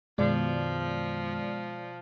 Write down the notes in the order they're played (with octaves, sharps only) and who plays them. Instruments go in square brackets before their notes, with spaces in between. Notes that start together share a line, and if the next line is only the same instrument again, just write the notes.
[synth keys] F#2 D#3 [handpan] B2 [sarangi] F3 [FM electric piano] G#3 D5